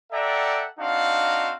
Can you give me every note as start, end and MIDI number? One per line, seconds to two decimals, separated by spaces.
0.13 0.67 69
0.13 0.67 74
0.13 0.67 76
0.13 0.67 78
0.13 0.67 79
0.13 0.67 82
0.78 1.53 60
0.78 1.53 62
0.78 1.53 63
0.78 1.53 66
0.78 1.53 77